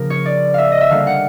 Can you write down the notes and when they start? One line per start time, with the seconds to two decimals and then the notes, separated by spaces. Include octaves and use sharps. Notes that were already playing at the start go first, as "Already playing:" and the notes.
Already playing: C#3 F3 A#3 A#4
0.10 C#5
0.26 D5
0.54 E5 F5
0.72 D#5
0.81 E5
0.90 D3 G3 A#3 F5
1.07 F#5